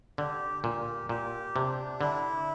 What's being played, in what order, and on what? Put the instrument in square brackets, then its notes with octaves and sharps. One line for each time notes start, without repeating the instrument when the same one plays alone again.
[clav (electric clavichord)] D3 [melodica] G4
[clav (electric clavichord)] A#2 [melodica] G4
[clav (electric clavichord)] A#2 [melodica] G4
[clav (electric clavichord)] C3 [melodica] D4
[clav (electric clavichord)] D3 [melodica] E4